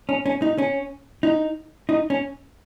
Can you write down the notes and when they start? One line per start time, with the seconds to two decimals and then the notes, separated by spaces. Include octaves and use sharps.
0.09 C#4
0.26 C#4
0.42 D#4
0.58 C#4
1.23 D#4
1.89 D#4
2.10 C#4